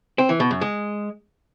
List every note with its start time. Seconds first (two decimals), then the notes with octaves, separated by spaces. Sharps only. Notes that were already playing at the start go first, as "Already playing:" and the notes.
0.18 C4
0.29 E3
0.40 B2
0.51 F#2
0.61 G#3